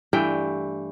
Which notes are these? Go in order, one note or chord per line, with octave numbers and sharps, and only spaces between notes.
G2 E3 A3 G5